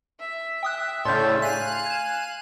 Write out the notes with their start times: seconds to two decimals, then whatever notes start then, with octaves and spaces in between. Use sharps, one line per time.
0.20 E5
0.63 G5 D#6 F#6
1.05 A2 C#3 D4 A4 C6 G6
1.42 F5 G#5 F#6 D#7
1.86 G#6 E7